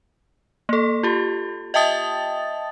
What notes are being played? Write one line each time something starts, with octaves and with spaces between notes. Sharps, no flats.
A#3 A4
F4 G4
D#5 E5 G5 A5 D#6 A6